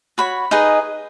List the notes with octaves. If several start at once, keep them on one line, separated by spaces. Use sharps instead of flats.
F#4 C#5 B5
D#4 G#4 B4 D#5